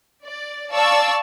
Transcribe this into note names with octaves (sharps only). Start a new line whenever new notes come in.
D5
D5 F5 A5 C#6 E6